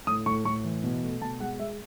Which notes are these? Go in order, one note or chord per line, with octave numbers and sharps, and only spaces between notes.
A2 D#6
A2 C#6
A2 C#6
E3
B2
A3
B2 A5
G#3 F#5
G#3 E5